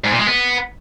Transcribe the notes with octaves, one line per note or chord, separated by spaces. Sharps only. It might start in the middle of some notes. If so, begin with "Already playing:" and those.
G#2
A#2
G#3
B3